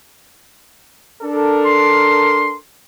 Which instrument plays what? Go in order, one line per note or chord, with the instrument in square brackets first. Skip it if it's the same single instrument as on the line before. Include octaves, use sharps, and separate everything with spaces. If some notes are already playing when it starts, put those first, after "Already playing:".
[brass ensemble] D4 A4 A#4
[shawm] C6